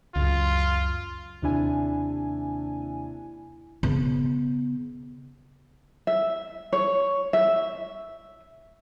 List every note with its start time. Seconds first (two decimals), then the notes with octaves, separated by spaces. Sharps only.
0.16 C#2 F#2 F4
1.42 D#2 C3 D4 E4 G#5
3.83 C#3 B3
6.07 E5
6.73 C#5
7.33 E5